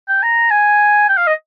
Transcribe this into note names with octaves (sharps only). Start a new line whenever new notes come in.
G5
A#5
G#5
G5
F5
D#5